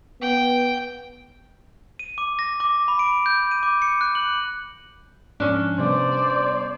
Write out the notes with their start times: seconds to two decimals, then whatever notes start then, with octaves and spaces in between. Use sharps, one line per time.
0.21 B3 G5
1.99 D#7
2.18 D6
2.39 A#6
2.60 D6
2.88 B5
2.99 D7
3.26 G6
3.51 D#7
3.63 D6
3.82 C#7
4.01 F#6
4.15 F#7
5.40 G#2 F3 C#4 D4
5.79 C3 G3 B3 C5 D5